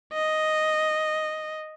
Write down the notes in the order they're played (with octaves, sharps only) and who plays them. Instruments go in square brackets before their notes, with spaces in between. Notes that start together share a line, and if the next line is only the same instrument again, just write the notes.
[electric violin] D#5